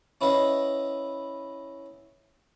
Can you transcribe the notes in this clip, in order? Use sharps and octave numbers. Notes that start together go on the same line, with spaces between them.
C#4 E4 B4 D#5 F#5